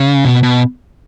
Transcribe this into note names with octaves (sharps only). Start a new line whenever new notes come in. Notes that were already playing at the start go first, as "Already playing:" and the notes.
Already playing: C#3
B2
B2